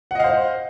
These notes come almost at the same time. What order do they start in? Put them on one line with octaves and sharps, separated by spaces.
F#5 D#5 F5 C5